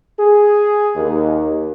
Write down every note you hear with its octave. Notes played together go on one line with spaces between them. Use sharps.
G#4
D#2